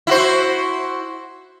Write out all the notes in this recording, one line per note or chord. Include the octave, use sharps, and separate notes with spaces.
E4 F#4 C5